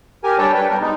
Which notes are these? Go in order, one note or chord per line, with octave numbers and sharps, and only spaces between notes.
G4 A#4 G#5
G3 D4 A4 C#5 G5 A5
B4 G5
B2 G3 A#4
G#3 D#4